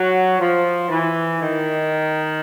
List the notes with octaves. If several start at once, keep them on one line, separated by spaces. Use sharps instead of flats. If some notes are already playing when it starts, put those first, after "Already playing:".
Already playing: F#3
F3
E3
D#3